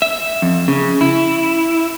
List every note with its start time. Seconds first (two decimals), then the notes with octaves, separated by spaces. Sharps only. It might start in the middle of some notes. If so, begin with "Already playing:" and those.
0.02 E5
0.42 F2
0.68 C#3
1.01 E4